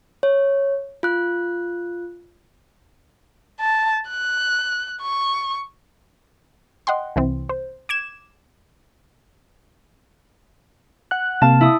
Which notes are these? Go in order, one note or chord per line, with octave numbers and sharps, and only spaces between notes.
C#5
F4 F#6
A5
F#6
C#6
D#5 F#5 G5 C6
C2 E3 C4
C5
D6 G#6 E7
F#5 F#6
C3 A#3 F5 A5
E4 D#6